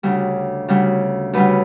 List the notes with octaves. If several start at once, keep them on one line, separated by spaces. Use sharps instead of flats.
D2 C#3 G3
D2 C#3 G3
D2 C#3 G3 B4